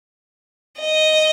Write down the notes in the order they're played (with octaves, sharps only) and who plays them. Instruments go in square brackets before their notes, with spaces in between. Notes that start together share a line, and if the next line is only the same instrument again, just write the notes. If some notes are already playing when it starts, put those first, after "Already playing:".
[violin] D#5